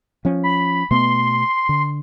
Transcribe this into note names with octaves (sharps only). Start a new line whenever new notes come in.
F3 C#4
B5
B2 A3 B3 C6
D3